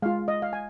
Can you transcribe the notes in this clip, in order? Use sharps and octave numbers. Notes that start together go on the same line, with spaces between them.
G#3 F4 F5
D#5
F5
G#5